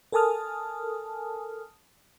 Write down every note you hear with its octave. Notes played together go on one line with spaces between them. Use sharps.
A4 A#4 G#5 A5 D#6 F6